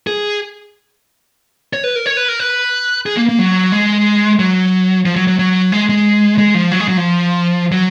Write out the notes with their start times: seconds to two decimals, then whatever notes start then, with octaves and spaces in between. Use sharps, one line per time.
0.07 G#4
1.73 C#5
1.84 B4
1.96 A#4
2.06 C#5
2.17 B4
2.28 A#4
2.40 B4
3.06 G#4
3.17 A#3
3.29 A#3
3.39 F#3
3.72 G#3
4.39 F#3
5.06 F3
5.16 F#3
5.27 F#3
5.39 F#3
5.72 G#3
5.89 G#3
6.38 G#3
6.54 F3
6.71 F#3
6.80 G#3
6.88 F#3
6.97 F3
7.72 F#3